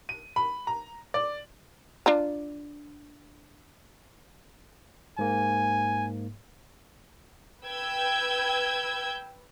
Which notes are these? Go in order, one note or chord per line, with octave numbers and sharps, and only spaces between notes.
D#7
B5
A#5
D5
D4 F4 A#5
G#2 A#3 G#5
B4 G5 E6 G6 G#6